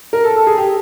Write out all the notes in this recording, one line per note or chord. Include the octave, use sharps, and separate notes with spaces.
A#4
A4
A4
G#4
G4